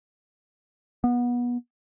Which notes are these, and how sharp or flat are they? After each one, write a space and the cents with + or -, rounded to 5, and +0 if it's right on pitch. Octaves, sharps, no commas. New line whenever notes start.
B3 -25